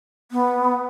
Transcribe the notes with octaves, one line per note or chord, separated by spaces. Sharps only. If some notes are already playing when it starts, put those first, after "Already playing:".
B3